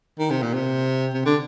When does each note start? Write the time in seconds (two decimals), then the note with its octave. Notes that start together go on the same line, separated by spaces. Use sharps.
0.19 D#3
0.31 C3
0.42 A#2
0.54 C3
1.14 C3
1.25 D3